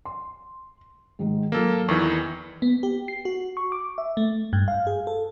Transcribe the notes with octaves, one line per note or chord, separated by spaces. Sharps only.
C6
G#2 D#3 G#3
F#3 A#3 F4 A4
E2 D#3 E3 C#6
B3
G4
C7
F#4
C#6
D6
E5
A3
G2
F5
G#4
A4